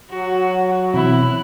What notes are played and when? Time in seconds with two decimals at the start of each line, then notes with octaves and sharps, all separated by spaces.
0.10 F#3 F#4
0.94 B2 E3 C4 E4 F#6